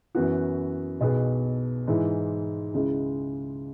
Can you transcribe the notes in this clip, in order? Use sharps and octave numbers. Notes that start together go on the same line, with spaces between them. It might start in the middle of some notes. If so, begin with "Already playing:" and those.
F#2 E3 B3 F#4
B1 B2 B3 G#4 B4
G#2 E3 G#3 E4
C#2 C#3 G#3 E4